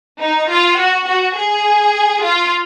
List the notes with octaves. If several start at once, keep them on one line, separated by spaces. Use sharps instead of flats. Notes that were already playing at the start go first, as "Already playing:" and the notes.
D#4
F4
F#4
F#4
G#4
F4